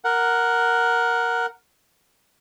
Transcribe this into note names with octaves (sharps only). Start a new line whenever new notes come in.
A#4 F#5